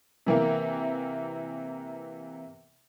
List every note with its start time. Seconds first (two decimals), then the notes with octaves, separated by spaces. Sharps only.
0.26 C3 E3 A#3